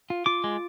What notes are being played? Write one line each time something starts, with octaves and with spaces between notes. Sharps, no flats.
F4
F4 D6
G#3